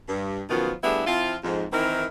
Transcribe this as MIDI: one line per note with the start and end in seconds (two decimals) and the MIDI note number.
0.09 0.43 43
0.49 0.73 42
0.49 0.73 47
0.49 0.73 51
0.49 0.73 53
0.49 0.73 59
0.49 0.73 65
0.84 1.02 45
0.84 1.02 55
0.84 1.02 59
0.84 1.02 62
0.84 1.02 64
0.84 1.02 68
1.06 1.35 53
1.06 1.35 60
1.06 1.35 64
1.06 1.35 65
1.44 1.65 41
1.44 1.65 44
1.73 2.06 51
1.73 2.06 52
1.73 2.06 60
1.73 2.06 63
1.73 2.06 64
1.73 2.06 70